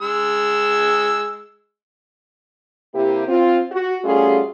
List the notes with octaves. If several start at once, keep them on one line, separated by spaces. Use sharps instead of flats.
G#3 E6
C3 A#3 E4 G4
C4 F4
F#4
G3 A3 C#4 F4 F#4 G#4